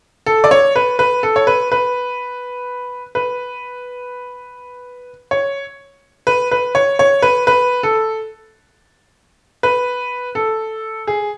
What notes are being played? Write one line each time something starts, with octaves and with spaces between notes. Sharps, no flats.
A4
D5
C#5
B4
B4
A4
C#5
B4
B4
B4
C#5
B4
B4
C#5
C#5
B4
B4
A4
B4
A4
G#4